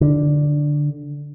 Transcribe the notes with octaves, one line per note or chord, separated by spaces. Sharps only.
D3